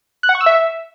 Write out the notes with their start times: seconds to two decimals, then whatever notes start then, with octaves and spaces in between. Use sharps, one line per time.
0.23 F#6
0.29 F#5
0.35 C#6
0.41 E6
0.46 E5